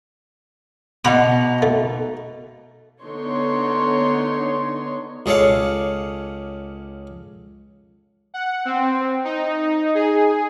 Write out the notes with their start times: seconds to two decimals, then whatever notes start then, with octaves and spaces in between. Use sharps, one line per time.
1.05 B2 D#4 F#5 B5 D6
1.62 A3
3.02 D3 B3 D#4 C#5 C6
5.26 C#2 G#4 A4 C#5 D5 F5
8.34 F#5
8.65 C4
9.25 D#4
9.95 G#4